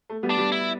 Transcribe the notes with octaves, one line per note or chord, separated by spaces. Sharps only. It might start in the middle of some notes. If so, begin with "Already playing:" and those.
A3
G3 B3
D4
G3
E4